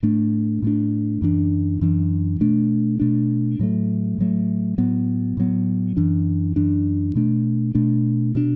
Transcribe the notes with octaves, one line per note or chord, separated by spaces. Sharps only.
A2 A3 D4
A2 A3 D4
F#2 E3 D4
F#2 E3 D4
B2 A3 D4
B2 A3 D4
A2 F#3 A3
A2 F#3 A3
A2 F#3 B3
A2 F#3 B3
F#2 E3 D4
F#2 E3 D4
B2 A3 D4
B2 A3 D4
B2 A3 D4